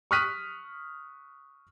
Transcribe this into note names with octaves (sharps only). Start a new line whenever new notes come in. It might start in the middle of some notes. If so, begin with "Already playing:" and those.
C#6 D#6 F6 F#6 B6 D#7